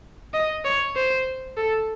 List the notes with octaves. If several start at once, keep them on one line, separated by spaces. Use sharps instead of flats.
D#5
C#5
C5
A4